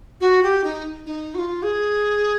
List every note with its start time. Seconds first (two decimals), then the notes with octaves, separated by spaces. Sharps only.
0.21 F#4
0.43 G4
0.64 D#4
1.06 D#4
1.35 F#4
1.39 F4
1.63 G#4